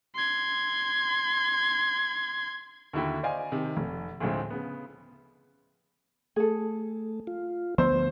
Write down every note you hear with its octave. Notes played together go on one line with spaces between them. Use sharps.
C6 G#6
D#2 D3 E4 F#4 G5
C5 D5 D#5 F5 G#5
C3 D#3
F1
D2 A2 D3 F3 G#3 C4
C#3 B3
A3 G#4 A4
F4
D2 F3 B3 C5 E6